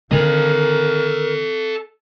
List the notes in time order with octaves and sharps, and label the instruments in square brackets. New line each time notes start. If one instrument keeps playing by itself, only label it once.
[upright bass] D3 D#3 [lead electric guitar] A4 D#5 [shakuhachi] A#4